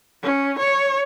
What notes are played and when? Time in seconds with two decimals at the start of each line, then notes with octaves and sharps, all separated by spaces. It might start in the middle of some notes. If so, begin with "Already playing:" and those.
0.23 C#4
0.60 C#5